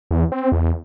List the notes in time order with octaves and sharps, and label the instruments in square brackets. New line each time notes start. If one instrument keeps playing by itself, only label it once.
[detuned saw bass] E2
C4
E2